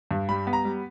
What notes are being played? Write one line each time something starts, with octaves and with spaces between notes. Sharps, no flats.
G2
G3 B5
B3
A#5
G3